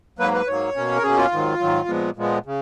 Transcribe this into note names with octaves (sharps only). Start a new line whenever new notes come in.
G#2 F#3 A#3 B4
B4
G#2 F#3 A#3 C#5
B2 A#3 C#4
A#4
B2 A#3 C#4 G#4
F4
G#2 D#3 F#3
G#2 D#3 F#3
A#2 F3 G#3 B3
A#2 F3 G#3 B3
C#3